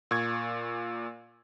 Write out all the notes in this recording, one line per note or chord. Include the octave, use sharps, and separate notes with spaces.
A#2 C#6 G#6